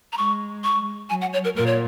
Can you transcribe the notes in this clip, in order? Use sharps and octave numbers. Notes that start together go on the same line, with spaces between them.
A#5
G#3 C#6
C#6
F#3 G#5
F#5
C#5
A#4
A#2 A#4
C#5